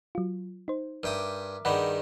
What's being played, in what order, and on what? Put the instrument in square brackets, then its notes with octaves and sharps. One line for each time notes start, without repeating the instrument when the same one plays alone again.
[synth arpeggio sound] F#3 F4
D#4 C5
[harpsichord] G2 G5 D#6 [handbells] A#4 E5 D6
[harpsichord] G2 D#3 G3 [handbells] G#4 D#5 [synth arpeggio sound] F#5 B5